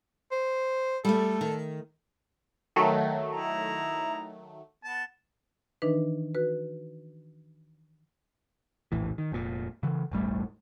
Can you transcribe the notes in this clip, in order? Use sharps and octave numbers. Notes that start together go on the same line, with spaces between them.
C5
G3 A3 A4
D#3
D#3 F#3 A3
D#4 E4 A#5
B3 A5
D#3 E3 D4 D#4 B4
F#4 B4
F1 A#1 A2 E3
D#3
F1 A#2
C#3 E3
E1 A1 G3 A3